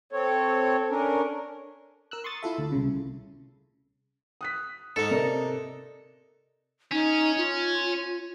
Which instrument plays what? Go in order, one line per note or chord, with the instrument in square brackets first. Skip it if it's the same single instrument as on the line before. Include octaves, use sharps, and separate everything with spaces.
[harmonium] C4 C#5 [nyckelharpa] A4
[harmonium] C#4 D4 A#4
[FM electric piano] A#4 E6 F#6
C6 C#6 D#6 A6
E4 F4 A4 E5
D2
C2 C#3
[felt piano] D#6 F#6 B6
[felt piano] G#2 [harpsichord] D#4 A4
[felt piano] C3 A#4 D5
[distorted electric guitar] C#4 [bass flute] D#4
[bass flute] F4